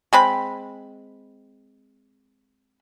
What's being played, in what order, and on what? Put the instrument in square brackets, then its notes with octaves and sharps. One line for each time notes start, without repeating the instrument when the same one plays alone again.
[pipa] G#3 C4 B5